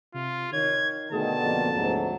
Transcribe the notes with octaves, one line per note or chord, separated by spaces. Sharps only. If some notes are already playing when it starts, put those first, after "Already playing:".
C3 F4
D#3 C#5 G#6
B2 D3 D#3 A3 G#4 A5
F2 A#3
D2 G#2 F#3